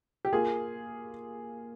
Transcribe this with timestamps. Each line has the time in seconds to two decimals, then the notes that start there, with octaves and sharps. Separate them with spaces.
0.25 G4
0.33 A#3 F4 G#4